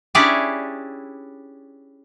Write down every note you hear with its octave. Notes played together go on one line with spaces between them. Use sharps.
C#4 D4 E4 G4 G#4 D5